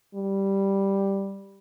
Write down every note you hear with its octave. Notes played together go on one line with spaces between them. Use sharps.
G3